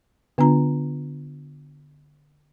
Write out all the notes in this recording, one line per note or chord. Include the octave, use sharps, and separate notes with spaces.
D3 B3 D4 F4 A#5